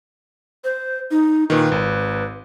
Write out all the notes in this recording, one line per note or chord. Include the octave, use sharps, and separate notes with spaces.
C5
D#4
A#2 D#3 B4
G#1